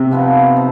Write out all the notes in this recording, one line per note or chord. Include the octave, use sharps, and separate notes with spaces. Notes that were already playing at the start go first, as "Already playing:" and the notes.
Already playing: C3
F3 B3 D#4 B4
F3